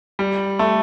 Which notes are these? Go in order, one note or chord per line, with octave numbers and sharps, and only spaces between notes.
G3
A3